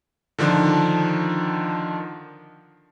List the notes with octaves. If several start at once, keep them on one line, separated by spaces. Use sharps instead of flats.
D3 D#3 F3 D4